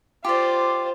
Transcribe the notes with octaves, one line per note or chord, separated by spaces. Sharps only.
F4 G4 C5 D5